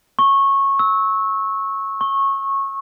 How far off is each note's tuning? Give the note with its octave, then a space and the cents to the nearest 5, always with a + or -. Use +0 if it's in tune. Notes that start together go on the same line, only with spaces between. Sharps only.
C#6 -15
E6 -25
C#6 -20